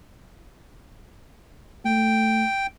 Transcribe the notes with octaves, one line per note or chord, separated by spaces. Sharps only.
A3 G5